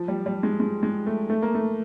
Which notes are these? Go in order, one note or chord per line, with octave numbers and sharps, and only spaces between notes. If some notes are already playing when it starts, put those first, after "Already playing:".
Already playing: F3
G3
G3
G#3
G#3
G#3
A3
A3
A#3
A3